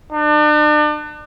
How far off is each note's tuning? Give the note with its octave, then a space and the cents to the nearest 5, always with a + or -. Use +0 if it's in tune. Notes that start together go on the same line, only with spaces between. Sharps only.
D4 +40